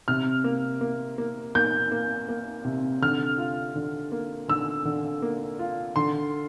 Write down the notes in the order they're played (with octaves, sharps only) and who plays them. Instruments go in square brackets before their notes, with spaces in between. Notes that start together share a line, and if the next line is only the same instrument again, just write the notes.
[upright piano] C3 F6
A#3
A#3
A#3
A#3 G6
A#3
A#3
C3
D3 F6
F4
D3
A#3
D3 E6
D3
A#3
F4
D3 C6